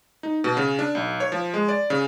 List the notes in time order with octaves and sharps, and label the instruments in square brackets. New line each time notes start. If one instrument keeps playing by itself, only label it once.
[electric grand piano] D#4
B2
C#3
D4
B1
C#5
F3
G#3
D5
C#3